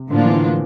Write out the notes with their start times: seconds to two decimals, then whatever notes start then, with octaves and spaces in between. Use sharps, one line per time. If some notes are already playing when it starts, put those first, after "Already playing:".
Already playing: C3
0.10 A2 D3 F3 A#3 D4 F4
0.24 E3
0.33 D3